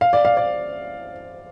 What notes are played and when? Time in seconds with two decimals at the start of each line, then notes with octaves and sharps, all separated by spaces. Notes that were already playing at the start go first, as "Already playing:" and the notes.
0.01 F5
0.13 D5
0.25 F5
0.37 D5